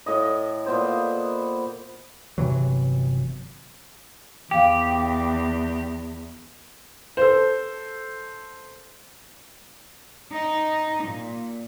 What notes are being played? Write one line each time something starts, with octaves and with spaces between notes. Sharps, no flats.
A2 D#5
A#2 B3 C5
G1 C3 E3 F#3
E2 G4 F5 G5
A4 C5
D#4
A#2